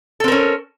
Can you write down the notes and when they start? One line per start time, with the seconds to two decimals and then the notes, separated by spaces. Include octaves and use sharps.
0.20 A4
0.24 C4
0.28 A#4
0.32 C#4